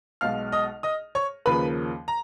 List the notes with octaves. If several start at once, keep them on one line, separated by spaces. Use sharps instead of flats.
B1 B2 G#3 F5 F6
D#5 D#6
D#5 D#6
C#5 C#6
D#2 C#3 F3 A#3 B4 B5
A#5